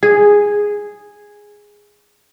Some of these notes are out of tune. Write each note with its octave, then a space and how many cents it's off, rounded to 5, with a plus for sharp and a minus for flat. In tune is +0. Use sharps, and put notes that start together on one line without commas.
G#4 -5